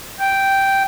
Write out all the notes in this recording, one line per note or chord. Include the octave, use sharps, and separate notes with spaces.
G5